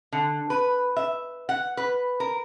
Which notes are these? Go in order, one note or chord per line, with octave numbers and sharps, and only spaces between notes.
D3
B4
E5
F#5
B4
A#4